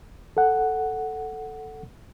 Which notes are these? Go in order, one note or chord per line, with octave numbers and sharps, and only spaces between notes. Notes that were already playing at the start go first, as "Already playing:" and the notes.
A4 F#5